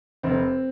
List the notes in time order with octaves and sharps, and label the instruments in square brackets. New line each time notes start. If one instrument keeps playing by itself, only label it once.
[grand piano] F1 C4